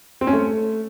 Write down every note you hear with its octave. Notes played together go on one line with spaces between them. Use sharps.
C4
C#4
A3